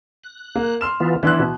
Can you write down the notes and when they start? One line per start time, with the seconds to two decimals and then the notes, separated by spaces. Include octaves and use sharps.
0.24 F#6
0.55 A#3
0.81 C6 F6 E7
1.00 E3 B3 F4
1.23 E3 B3 D4 E4 C6 F#6
1.39 B2